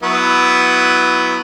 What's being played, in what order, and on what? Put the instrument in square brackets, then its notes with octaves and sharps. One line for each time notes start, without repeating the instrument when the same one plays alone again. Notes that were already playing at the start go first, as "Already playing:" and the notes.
[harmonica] F#3 B3 E4